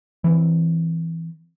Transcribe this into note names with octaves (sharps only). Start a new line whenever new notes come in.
E3 C4